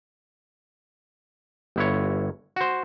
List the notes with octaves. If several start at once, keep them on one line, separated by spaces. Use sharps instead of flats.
G1 E4 C#5
F#4 C5